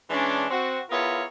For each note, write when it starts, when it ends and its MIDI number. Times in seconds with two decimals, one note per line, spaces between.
0.10 0.45 52
0.10 0.45 56
0.10 0.45 61
0.10 0.45 62
0.50 0.79 60
0.50 0.79 66
0.90 1.23 59
0.90 1.23 64
0.90 1.23 65
0.90 1.23 68
0.90 1.23 70
0.90 1.23 73